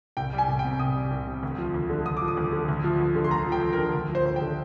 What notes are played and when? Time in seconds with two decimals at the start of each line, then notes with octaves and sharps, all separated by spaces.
0.17 C2 G5
0.33 G3
0.38 G#5
0.48 C2
0.59 G5
0.64 C3
0.79 C2 D#6
0.96 G3
1.11 C2
1.27 C3
1.43 D2
1.58 F3
1.74 D2
1.90 D3
2.06 D2 D#6
2.17 F3 D6
2.28 D#6
2.37 D2
2.52 D3
2.68 D2
2.84 F3
3.00 D2
3.15 D3
3.24 C6
3.31 D2 A#5
3.47 F3
3.52 G5
3.62 D2
3.73 A#4
3.78 D3
3.94 D2
4.09 F3
4.15 C5
4.25 D2
4.36 G5
4.41 D3